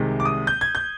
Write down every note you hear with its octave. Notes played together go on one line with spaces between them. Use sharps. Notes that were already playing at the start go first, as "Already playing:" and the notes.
Already playing: C2 C3 D#3 G#3
D6
D#6
G6
G#6
G6